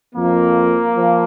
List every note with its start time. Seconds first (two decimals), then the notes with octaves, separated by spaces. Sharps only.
0.15 F2 F3 A#3
0.96 F3